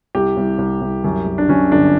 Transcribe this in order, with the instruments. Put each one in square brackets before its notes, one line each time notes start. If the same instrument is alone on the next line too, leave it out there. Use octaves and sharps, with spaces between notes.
[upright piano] C2 G4
C2
C2
C2
F#2
F#2
D4
F#2 C#4
G1 D4